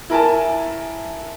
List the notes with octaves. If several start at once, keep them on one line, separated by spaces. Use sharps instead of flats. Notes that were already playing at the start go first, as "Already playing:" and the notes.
E4 A#4 G#5 A5